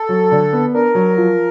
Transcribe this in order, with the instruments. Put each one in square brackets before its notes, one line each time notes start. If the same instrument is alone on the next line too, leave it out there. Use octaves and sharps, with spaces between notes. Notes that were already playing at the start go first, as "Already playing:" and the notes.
Already playing: [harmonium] A4
[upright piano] F#3
D3
B3
[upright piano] D4 [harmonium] A#4
[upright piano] F#3
F3